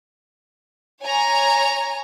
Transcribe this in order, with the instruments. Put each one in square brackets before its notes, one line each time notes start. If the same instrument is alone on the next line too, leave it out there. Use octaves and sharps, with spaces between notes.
[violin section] C#5 G#5 A#5